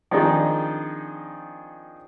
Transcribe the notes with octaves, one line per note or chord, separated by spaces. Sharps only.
D#3 F3 C4 D4 D#4 G#4